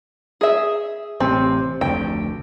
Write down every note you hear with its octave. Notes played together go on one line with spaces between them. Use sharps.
G#4 E5
A1 C3 C4
F1 D2 G5